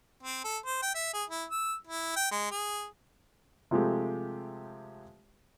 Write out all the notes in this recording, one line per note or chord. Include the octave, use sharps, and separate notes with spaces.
C4
A4
C5
G5
E5
G#4
E4
E6
E4
G5
G#3
G#4
C3 F3 G#3 A3 G4